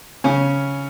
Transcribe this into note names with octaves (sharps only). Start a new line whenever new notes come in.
C#3 C#4